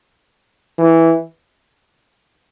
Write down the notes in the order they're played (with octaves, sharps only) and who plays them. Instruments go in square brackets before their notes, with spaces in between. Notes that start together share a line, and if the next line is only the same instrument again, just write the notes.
[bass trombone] E3